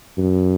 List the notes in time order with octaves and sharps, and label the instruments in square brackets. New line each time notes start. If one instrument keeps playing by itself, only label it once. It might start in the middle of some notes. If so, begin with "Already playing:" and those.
[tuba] F#2